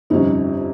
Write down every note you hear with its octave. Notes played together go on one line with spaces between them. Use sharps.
G1 F2 C3 G3 C#4 D#4